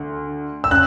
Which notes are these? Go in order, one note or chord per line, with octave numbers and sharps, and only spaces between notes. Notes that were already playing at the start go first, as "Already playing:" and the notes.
Already playing: D2
E6
C#3 F#6